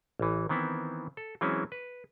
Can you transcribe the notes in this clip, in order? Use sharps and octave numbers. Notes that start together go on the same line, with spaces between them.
A1 E3
D#3 E3 B3 C4 E4
A4
E3 F#3 G#3 C4 C#4 E4
B4